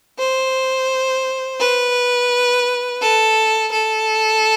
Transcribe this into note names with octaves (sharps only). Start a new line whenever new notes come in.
C5
B4
A4
A4